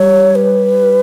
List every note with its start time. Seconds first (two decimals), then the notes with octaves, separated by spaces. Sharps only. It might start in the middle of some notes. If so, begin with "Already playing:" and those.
Already playing: G3 C#5
0.35 B4